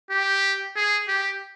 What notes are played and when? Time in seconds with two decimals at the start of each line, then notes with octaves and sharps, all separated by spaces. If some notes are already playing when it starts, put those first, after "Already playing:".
0.11 G4
0.76 G#4
1.08 G4